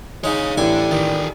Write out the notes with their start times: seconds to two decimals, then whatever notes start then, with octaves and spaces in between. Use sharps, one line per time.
0.24 G#3 D#4 C#5 F5
0.57 A1 D3 G3 A4 G#5
0.91 D#3 G4 A4